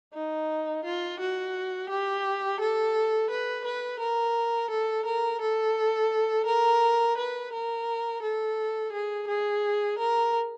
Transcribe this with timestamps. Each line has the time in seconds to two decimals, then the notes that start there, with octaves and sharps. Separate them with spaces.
0.14 D#4
0.84 F4
1.20 F#4
1.89 G4
2.60 A4
3.30 B4
3.65 B4
4.00 A#4
4.70 A4
5.06 A#4
5.41 A4
6.46 A#4
7.18 B4
7.53 A#4
8.22 A4
8.92 G#4
9.28 G#4
9.99 A#4